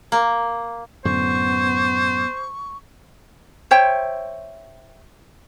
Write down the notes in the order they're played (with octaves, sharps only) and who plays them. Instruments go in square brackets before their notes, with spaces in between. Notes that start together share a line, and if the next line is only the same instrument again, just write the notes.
[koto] A#3
[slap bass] F#2 A2 D3 [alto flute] B3 [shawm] C5 [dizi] C#6
[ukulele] C5 C#5 E5 G5